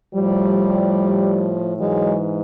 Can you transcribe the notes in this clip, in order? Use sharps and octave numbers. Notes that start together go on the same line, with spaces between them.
A2 F3 G3
G#2 E3 F#3 G#3